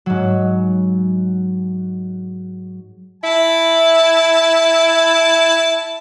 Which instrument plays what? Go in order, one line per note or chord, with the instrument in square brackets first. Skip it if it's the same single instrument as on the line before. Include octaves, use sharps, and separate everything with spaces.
[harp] G#2 F#3
[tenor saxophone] E4 [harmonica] A5